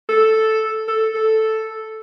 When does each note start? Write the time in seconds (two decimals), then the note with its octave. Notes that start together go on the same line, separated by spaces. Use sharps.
0.09 A4
0.88 A4
1.14 A4